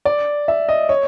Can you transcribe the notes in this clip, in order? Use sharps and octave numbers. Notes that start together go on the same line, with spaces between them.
D5
E5
D#5
C#5